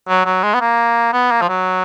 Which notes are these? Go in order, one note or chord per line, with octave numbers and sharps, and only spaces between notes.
F#3
F#3
G#3
B3
A#3
B3
A#3
F3
F#3